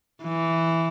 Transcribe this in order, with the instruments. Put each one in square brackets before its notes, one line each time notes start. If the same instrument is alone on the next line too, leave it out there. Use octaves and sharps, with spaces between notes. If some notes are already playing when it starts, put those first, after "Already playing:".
[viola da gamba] E3